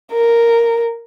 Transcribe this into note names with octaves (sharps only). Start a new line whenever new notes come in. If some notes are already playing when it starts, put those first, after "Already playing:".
A#4